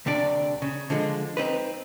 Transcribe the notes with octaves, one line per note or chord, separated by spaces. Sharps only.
D2 C3 D4 D5
C#3
D3 F3 G#3
C4 D#4 B4